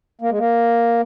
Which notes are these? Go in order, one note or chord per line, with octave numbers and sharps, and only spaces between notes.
A#3
G#3
A#3